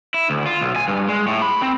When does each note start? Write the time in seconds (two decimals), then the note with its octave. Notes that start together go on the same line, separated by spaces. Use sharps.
0.14 E4
0.30 D2
0.46 F4
0.61 B1
0.76 G#5
0.88 G2
1.09 G#3
1.27 A2
1.42 B5
1.62 C4